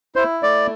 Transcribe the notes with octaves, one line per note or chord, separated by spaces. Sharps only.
E4 C5
A3 D5